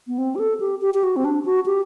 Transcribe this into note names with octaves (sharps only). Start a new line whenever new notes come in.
B3
C4
G4
A4
G4
G4
G4
F#4
C4
D4
F#4
G4